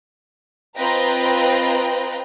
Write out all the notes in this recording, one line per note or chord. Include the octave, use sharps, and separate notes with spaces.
C4 F4 B4 D#5 G5 A#5